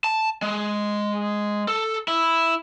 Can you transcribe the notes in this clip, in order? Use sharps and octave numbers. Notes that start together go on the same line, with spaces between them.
A5
G#3
A4
E4